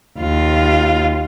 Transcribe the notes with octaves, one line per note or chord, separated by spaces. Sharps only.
D#2 F4